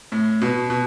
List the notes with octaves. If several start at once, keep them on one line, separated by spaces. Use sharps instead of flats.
A2
B2
B2